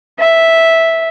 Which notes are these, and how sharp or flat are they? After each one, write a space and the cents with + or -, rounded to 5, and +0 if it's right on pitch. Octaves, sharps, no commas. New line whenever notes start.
E5 -5